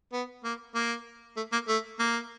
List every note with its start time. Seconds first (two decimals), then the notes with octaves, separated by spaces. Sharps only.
0.13 B3
0.44 A#3
0.74 A#3
1.36 A3
1.52 A#3
1.68 A3
1.99 A#3